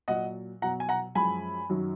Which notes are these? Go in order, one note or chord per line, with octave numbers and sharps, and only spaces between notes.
A#2 F#3 D#5 F#5
B2 F#3 F#5 A#5
G#5
F#5 A#5
F#2 F3 G#3 G#5 B5
F#2 D#3 F#3